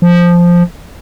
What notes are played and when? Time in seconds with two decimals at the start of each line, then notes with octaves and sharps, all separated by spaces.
0.02 F3